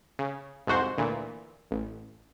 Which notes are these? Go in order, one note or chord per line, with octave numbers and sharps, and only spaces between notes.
C#3
C2 F2 G#2 F#4 C5
D2 A#2 E3
A1